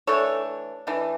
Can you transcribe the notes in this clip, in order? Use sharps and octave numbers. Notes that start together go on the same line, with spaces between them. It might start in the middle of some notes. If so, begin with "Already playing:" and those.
E3 A3 D4 A4 C#5
E3 A3 D4